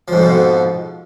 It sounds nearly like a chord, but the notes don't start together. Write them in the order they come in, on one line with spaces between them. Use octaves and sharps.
F3 G#2 F2 B2